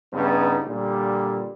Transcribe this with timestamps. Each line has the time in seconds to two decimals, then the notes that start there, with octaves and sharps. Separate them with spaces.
0.12 G2 C#3 B3 D#4
0.67 A#2 D3 G3